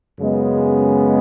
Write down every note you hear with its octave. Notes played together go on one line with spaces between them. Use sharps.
F#2 C#3 G#3 B3